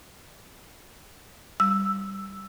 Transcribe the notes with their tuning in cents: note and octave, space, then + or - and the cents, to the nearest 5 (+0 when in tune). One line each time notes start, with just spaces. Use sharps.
G3 +0 E6 +0